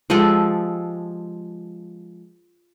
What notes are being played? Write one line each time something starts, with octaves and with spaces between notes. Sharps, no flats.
F3 G#3 G4 A4